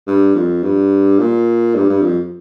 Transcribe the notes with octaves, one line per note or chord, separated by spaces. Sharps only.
G2
F2
G2
A#2
G2
G2
F2